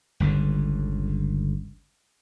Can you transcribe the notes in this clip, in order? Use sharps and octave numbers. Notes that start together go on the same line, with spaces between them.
G1 C#2 G2 D3